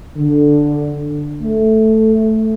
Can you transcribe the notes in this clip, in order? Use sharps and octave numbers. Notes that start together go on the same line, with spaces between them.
D3
A3